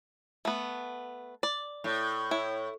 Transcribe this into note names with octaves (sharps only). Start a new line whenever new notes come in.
A3 B3
D5
A2
E4 C#5